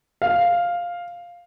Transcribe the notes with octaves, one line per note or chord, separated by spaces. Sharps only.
F5